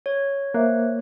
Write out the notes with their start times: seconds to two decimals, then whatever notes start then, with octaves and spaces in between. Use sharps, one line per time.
0.06 C#5
0.54 A#3 C5 E5 F#6